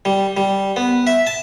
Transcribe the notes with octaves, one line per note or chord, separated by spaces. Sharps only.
G3
G3
B3
E5
A5